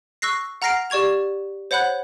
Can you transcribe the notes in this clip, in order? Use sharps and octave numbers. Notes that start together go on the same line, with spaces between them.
C#6 E6 F#6 A#6 C7
F#5 A#5 F6 A#6 C7 D7
G4 D5 C#6 G#6 F7
C5 C#5 F#5 B5 F#6